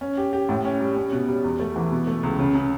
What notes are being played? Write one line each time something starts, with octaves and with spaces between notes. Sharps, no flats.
C#4
G4
G4
A2
C#4
G3
C#4
B2
G3
E2
A3
E3
B2
A3
C#2
C#3
C#3